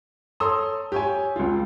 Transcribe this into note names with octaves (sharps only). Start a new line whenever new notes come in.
A4 C#5 A#5 C6 D#6 E6
G4 C#5 G#5
C#2 F4